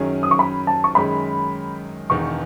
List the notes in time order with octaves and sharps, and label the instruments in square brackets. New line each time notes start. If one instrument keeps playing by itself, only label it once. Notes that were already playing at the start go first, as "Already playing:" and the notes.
Already playing: [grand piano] F#2 D#3 F#3 C#4 G#4
[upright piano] D#6
C#6
B5
A5
C#6
[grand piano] F#2 D#3 G#3 C#4 G#4 [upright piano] B5
[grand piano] E1 E2 D#3 [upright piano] C#6